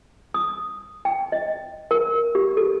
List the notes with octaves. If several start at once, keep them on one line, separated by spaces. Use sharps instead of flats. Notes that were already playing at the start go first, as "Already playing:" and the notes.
D#6
G5
D#5
A#4
G4
A4